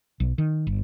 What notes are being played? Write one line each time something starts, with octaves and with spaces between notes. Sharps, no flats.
B1
D#3
G1